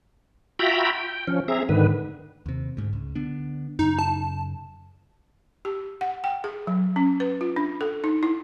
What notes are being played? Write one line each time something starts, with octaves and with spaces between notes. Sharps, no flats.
F4 F#4 E5 G5 A#5 B5
G5
F3 C#4
C4 G#4 E5 A#5
G#2 D3 D#3 B4
D#2 C3
D2 G#2
C#2
D3 B3 D4
F#2 C#3 D#4
A5
G4
F#5
G5
G#4
F#3
C#4
B4
F4
D4
A4
D#4
E4